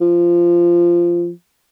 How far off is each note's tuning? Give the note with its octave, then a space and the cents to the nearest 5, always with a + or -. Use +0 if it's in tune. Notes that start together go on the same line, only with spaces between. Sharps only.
F3 -15